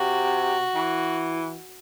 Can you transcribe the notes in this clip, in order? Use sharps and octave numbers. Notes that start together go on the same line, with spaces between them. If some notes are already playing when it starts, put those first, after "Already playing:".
Already playing: C3 F#4
E3